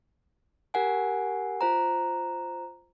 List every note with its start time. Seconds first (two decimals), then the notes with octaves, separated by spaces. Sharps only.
0.74 G4 A#4 F#5 G#5
1.61 F4 C5 A#5